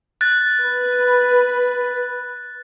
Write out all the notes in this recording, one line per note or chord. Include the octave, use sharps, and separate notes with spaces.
F#6 A6
B4